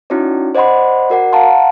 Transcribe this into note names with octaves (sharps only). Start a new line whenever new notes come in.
C#4 D#4 E4 F#4 C#5 D5
C5 D5 D#5 F#5 B5 C6
F#4 A#4 D5 F#5
F5 F#5 A5 A#5 C6